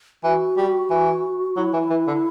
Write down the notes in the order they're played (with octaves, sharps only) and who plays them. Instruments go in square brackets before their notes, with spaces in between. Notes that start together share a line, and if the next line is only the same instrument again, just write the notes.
[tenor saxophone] E3 [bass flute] F#4
[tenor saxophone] G3
E3
[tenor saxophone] F#3 [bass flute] E4
[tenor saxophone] E3
E3
D3